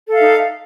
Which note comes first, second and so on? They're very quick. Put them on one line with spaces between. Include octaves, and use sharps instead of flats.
A4 F5 E5 D#4